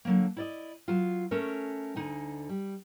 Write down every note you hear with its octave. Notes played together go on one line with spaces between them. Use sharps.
D3 F#3 A#3
E4 D5 D#5
F#3 F4
A3 C#4 A#4
D2 D3 D#4 G#5
G3